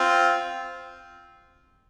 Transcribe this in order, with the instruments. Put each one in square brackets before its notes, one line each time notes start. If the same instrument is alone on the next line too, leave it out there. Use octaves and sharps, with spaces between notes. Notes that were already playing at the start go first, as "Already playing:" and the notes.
Already playing: [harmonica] C4 F4